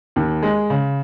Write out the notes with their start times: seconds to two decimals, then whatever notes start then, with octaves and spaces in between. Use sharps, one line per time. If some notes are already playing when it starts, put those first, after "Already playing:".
0.16 D#2
0.43 G#3
0.70 C#3